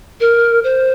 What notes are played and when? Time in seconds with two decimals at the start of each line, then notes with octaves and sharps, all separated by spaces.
0.20 A#4
0.64 C5